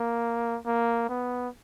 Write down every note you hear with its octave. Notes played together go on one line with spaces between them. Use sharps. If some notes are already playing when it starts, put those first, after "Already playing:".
Already playing: A#3
A#3
B3